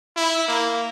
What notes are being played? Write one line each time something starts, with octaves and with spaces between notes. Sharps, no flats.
E4
A#3